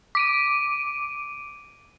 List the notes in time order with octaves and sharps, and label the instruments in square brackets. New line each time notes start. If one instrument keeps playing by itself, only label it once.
[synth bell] D6 D7 D#7